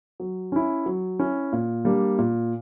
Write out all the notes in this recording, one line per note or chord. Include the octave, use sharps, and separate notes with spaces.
F#3
C#4 E4
F#3
C#4 E4
A#2
G3 A#3 D4
A#2